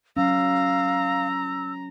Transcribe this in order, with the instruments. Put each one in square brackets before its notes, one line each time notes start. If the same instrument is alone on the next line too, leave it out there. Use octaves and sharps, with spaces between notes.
[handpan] F#3 C#4 [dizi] F5 [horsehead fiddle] A#5 [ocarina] E6